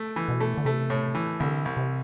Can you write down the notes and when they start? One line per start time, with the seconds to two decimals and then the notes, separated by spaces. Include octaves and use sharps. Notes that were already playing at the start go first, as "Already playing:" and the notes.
Already playing: A3
0.16 E3
0.28 B2
0.40 A3
0.57 D3
0.65 C3 A3
0.90 A2
1.15 E3
1.40 C2 D3
1.65 C2
1.77 C3